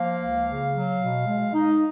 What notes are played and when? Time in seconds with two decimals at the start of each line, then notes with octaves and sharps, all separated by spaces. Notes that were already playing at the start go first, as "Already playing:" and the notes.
Already playing: F3 A#3 F5
0.18 C#2
0.46 C#3
0.73 F#3
0.99 B2
1.26 G#3
1.53 D#4